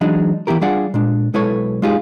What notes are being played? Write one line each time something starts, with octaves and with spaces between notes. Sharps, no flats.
E3 F#3 G#3 D4 D#4
E3 B3 E4 G4 A#4
G3 D4 F4 G#4 D5 F#5
A#2 G#3 D4
B1 G#3 E4 A4 B4 C#5
G#3 D#4 F4 G4 G#4